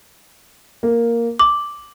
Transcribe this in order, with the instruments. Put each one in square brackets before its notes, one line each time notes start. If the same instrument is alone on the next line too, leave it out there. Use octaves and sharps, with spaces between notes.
[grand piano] A#3
[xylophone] D6 [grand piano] F#7